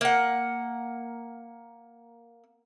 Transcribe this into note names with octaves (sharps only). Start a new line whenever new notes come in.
A#3 F#5